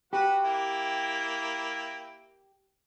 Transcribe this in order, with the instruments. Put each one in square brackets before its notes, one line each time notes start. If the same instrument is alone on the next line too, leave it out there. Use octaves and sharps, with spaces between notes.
[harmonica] F#4 B4 F#5 [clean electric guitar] G4
[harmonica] A#3 E4 G5